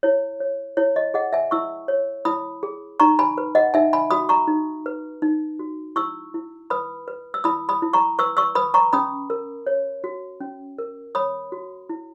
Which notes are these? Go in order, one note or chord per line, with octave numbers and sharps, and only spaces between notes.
E4 C#5
C#5
E4 C#5
D#5
G#4 D#5 F#5
E5 G#5
E4 C#6 E6
C#5
E4 B5 D#6
G#4
D#4 A#5 C#6
G#5 B5
B4
D#5 F#5
D#4 E5 G#5
G#5 B5
F#4 B5 D#6
A#5 C#6
D#4
B4
D#4
F#4
E4 C#6 E6
E4
B4 B5 D#6
B4
E6
E4 B5 D#6
B5 D#6
E4
A#5 C#6
B4 C#6 E6
C#6 E6
B4 B5 D#6
A#5 C#6
C#4 B5 D#6
A#4
C#5
F#4
C#4
A#4
C#5 B5 D#6
F#4
E4